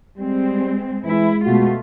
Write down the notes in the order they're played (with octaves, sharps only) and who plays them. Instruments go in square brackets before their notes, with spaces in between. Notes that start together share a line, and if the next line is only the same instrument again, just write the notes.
[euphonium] G3 [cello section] G#3 C4
[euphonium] E3 [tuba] G#3 [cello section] E4
[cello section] B2 A3 F4 [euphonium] F#4